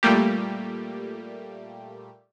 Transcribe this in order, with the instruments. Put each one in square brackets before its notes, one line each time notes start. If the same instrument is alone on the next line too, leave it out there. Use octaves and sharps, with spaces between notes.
[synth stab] A#2 G3 A3 A#3 G4